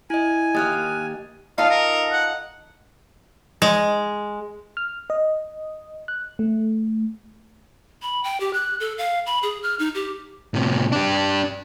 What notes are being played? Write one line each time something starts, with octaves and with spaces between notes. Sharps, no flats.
E4 D#5 G#5
D#2 G4 D#5 F6 F#6 A6
D#4 F4 A4 F5
A#4
F#5
G#3
F6
D#5
F#6
A3
B5
G5
G4
F#6
A4
F5
B5
G#4
F6
D#4
G4
A2 C3
D4 G4